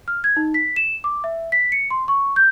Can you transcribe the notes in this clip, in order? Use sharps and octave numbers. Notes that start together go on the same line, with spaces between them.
F6
G#6
D#4
B6
E7
D6
E5
B6
C#7
C6
C#6
G6